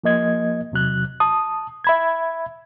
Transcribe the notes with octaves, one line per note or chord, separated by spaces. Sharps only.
F3 A#3 D#5 G#6
E2 C3 F#3 F#6
A5 D#6
E5 B5 G#6